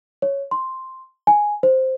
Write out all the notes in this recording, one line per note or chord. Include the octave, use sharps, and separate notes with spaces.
C#5
C6
G#5
C5